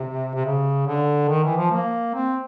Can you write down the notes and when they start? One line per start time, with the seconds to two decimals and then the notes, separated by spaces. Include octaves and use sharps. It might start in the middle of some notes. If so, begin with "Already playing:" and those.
Already playing: C3
0.34 C3
0.46 C#3
0.87 D3
1.29 D#3
1.44 E3
1.57 F3
1.71 A#3
2.14 C4